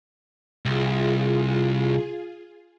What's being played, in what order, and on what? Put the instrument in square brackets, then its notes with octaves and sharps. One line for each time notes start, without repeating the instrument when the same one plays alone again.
[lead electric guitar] C2 [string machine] F4 G#4